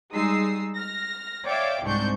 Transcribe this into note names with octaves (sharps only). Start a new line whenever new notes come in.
G3 G#3 D#4 D#6 E6 C7
F6 A#6
C#5 D5 E5 F5 G5 D6
C2 G#2 C4 D4 C#6 G6